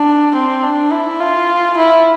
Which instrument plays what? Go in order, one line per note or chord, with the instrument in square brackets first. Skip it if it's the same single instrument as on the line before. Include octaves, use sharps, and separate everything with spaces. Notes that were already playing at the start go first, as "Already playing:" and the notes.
Already playing: [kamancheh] D4
C4
D4
E4
F4
E4